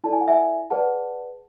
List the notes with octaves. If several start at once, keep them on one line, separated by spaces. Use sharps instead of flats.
E4 A4 D5 A5
G#5
F#5
E5 G#5
G#4 B4 D5 F#5 A5